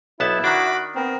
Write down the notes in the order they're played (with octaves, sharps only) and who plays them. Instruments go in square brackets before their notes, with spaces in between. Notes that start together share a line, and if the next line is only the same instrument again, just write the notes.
[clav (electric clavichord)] B1 B3 A5 [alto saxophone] E4
[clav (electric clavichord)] D#3 D4 [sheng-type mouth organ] F#4 B5 D6
[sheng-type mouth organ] B3 A#4 [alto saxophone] C4